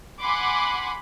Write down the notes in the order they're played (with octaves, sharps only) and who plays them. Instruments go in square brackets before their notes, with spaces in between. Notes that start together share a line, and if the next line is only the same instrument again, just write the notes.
[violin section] F#5 G#5 B5 C6 D6